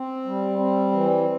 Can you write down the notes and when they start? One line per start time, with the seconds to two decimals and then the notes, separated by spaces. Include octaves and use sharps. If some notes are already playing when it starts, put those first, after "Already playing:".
Already playing: C4
0.25 G3
0.59 C4
0.92 E3